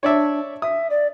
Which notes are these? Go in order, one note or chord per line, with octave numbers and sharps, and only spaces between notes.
D4 C#5 D5 E5
E5 D#6
D5